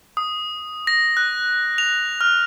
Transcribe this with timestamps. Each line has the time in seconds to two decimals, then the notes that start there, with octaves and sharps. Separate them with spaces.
0.17 D#6
0.87 A#6
1.17 F#6
1.78 F7
2.21 F6